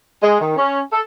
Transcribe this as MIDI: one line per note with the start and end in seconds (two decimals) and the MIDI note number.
0.23 0.36 56
0.40 0.53 51
0.56 0.81 61
0.92 1.00 69